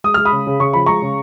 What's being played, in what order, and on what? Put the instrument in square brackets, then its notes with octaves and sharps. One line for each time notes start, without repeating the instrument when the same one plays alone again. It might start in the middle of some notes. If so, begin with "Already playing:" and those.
[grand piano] G#3 D#6
G#3 F6
B5 D#6
C#3
C#3
C#3 C#6
F3 B5
G#3 A#5 C#6
C#3